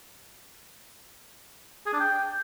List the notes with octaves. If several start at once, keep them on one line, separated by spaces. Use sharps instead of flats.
G#4
D4
G5